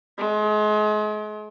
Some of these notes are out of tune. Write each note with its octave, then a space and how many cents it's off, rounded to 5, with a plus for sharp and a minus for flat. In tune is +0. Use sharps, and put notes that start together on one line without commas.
G#3 +35